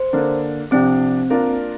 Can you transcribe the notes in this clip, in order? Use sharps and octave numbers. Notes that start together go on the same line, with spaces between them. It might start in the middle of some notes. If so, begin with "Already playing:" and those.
Already playing: C5
D3 A#3 D4
C3 F3 C4 D4 G4 D5
A#3 D4 F4 A#4 D5